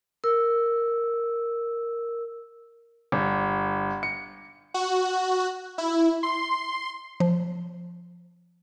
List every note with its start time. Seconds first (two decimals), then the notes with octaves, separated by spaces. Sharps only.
0.24 A#4 E6
3.12 G1
4.03 C#7
4.74 F#4
5.78 E4
6.23 C6
7.20 F3